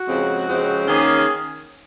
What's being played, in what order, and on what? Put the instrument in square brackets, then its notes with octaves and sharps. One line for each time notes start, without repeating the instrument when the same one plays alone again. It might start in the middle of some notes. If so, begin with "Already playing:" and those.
Already playing: [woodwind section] F#4
[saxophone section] F2 C#3 G#3 C4
F2 C#3 G#3 C4
[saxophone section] D#3 A#3 C#4 [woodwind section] G#4